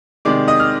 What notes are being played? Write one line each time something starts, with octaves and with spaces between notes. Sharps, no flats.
C3 D#3 G#3 D5 D6
D#5 D#6
F6